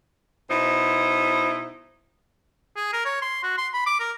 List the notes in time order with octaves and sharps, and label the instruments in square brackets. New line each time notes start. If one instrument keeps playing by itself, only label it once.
[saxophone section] B2 D#4 E4 C5
[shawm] G#4
A#4
C#5
C6
F#4
C6
B5
D6
A#4